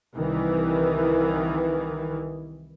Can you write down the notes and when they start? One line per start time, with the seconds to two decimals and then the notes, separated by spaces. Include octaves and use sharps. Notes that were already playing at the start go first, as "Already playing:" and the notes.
0.15 C2 D#3 E3